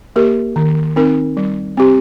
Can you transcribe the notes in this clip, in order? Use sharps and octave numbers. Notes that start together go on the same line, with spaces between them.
A#3 G4 A#4
D#3
C4 D#4 A#4
G3
C4 G4